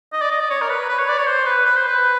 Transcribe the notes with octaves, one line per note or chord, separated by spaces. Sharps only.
D#5
D5
D#5
D5
C#5
A#4
B4
B4
C#5
D5
C#5
C5
B4
B4
C5
B4